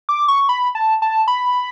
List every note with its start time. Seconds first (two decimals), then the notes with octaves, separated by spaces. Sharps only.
0.09 D6
0.28 C#6
0.49 B5
0.75 A5
1.02 A5
1.28 B5